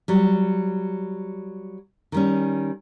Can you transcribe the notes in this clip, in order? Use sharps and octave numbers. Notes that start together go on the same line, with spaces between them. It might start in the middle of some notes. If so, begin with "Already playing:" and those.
F#3 G3
D#3 G3 C#4